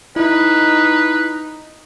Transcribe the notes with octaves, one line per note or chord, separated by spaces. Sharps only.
D#4 E4 B4